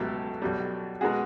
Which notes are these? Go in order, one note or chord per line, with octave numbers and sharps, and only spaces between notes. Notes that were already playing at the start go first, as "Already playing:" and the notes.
Already playing: C#2 B2 F#3 A3 G4 A4
B1 B2 G3
B2 G#3 F#4 G#4